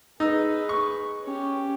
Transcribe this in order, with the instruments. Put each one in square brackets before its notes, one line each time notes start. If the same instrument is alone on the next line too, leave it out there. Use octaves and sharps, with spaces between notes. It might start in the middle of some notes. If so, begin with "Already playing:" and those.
[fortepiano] D#4 E6 [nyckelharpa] G#4 B4
[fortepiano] C#6
[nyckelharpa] C#4 G4